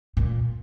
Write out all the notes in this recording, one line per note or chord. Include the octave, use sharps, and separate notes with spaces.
A#2